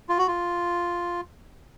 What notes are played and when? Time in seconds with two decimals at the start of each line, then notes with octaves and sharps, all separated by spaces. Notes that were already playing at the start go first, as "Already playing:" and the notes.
0.09 F4
0.18 F#4
0.28 F4